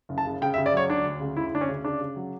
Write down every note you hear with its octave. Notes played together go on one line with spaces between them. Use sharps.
F#1
A5
C#3
C#3 G5
E5
C#3
D5
F#3 C#5
D2 D4
D2
C#3
D2 E4
D2 D4
C#4
C#3
C#3 D4
C#3
F#3